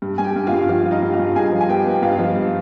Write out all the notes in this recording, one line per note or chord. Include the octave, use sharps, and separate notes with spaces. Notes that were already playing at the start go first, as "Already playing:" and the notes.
G2
G2 G#5
G4 G5
G2
F4 F5
G2
F3 F4 F5
F3
D#4 D#5
G2
F4 F5
G2
G2 G#4 G#5
F3
G#5
B3 G4 G5
B3
G5
G2 F4 F5
F3
G2